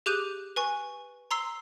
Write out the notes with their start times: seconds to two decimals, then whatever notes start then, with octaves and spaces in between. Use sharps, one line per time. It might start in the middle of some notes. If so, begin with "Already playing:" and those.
0.06 G4 G#4 D6 F#6 G6 D#7
0.56 B4 G#5 C#6
1.31 A#5 C6 E6 C7